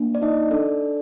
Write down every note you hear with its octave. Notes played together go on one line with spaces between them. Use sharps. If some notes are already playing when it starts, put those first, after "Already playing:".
Already playing: A#3 D4
D5
D#4 D#5
D4 A4 D5